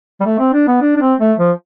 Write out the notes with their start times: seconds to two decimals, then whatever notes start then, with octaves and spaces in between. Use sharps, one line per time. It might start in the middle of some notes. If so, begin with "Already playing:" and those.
0.20 G3
0.25 A3
0.39 C4
0.53 D4
0.68 B3
0.82 D4
0.97 D4
1.01 C4
1.19 A3
1.38 F3